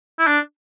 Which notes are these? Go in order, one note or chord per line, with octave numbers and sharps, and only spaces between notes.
E4
D4